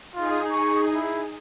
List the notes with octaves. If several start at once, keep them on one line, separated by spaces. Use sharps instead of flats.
D#4 F4 G#4
C#6
E4